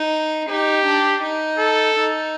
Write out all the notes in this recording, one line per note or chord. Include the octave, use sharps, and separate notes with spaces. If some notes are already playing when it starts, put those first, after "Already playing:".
Already playing: D#4
D#4 G4
D4
D#4
A4
D#4